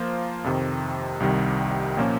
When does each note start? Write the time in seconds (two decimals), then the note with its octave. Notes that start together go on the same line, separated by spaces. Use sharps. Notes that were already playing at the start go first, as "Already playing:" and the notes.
Already playing: F3 A#3 F4 C5
0.44 F2 C3 D#3
1.20 C2 C3 D#3 G3
1.97 A#2 F3 A#3 C#4